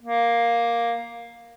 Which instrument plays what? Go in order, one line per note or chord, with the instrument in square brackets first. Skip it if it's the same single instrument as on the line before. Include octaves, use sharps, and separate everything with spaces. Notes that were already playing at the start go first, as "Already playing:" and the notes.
[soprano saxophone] A#3